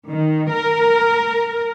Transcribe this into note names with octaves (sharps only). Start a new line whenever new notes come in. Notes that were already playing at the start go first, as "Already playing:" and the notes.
D#3
A#4